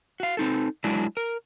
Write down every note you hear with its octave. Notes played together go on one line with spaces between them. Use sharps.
F#4 F5
C4 D#4 A4
F#3 G#3 D4 E4 D5
A#4